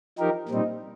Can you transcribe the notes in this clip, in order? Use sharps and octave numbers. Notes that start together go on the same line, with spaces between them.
F3 D#4 G4 A#4
A#2 G3 C4 D#4